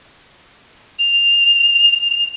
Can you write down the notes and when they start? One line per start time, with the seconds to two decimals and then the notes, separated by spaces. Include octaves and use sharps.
0.99 F7